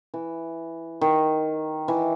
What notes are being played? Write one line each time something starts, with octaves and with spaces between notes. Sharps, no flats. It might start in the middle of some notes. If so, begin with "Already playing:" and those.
E3
D#3
E3